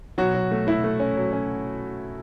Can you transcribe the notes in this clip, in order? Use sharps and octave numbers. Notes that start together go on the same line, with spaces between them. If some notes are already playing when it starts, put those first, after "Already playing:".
B2 F#3 F#4
F#3
A3
A3 E4
A3
C#4
F#3
C#4